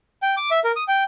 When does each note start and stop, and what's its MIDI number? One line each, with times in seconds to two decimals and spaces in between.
0.22 0.35 79
0.37 0.50 86
0.51 0.60 76
0.64 0.72 70
0.76 0.84 87
0.88 1.04 79